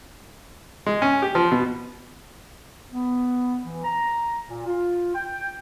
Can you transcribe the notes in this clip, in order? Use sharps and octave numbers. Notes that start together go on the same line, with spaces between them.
G#3
C#4
G4
F3
B2
B3
E3
A#5
A#2
F4
G5